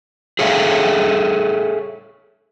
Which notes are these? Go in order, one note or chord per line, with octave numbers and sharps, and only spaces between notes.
G#4 A4 C#5 E5 F5